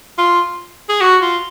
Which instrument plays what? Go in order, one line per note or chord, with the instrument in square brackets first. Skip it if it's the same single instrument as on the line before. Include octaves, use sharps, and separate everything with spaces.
[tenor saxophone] F4
G#4
F#4
F4